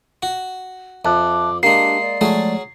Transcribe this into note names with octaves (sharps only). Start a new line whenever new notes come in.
F#4
F2 E5 A5 D6 F#6
G#3 A#3 D4 G4 C7
D5
F3 F#3 G#3 A3 C#4 G#4